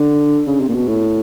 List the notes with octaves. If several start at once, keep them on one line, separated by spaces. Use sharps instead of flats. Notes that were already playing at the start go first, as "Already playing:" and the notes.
Already playing: D3
C#3
C3
A#2
B2
A2